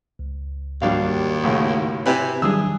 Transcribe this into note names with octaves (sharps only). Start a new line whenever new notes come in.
C#2
D#2 G#2 G3 D4 F#4 F5
B1 A2 C#3
C3 E4 B4 G#5
D#3 F#3 G3 D4 G#4 D#6 E6